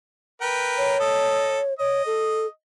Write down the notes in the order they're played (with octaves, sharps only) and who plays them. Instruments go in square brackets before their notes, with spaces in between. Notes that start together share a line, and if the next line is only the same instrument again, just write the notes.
[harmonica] A#4 B4 G5
[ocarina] C#5
[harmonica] A4 D#5
[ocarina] C#5 [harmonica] D#5
[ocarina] A4